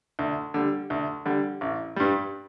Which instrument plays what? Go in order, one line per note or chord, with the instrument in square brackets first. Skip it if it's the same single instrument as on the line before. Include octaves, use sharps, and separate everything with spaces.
[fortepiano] D2
D3 G3
D2
D3 G3
A1
G2 G3